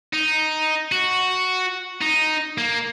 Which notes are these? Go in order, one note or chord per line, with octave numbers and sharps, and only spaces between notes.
D#4
F#4
D#4
A#3